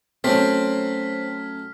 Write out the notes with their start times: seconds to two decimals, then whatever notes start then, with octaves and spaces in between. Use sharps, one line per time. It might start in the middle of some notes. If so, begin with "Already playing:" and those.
0.24 F#3 A3 C4 C#4 C#5 F6 B6